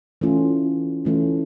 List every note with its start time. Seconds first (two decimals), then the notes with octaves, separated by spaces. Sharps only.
0.21 E3 A3 C#4 F4
1.05 E3 A3 C#4 F4